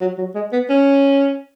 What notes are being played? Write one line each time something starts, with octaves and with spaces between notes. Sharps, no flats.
F#3
F#3
G#3
B3
C#4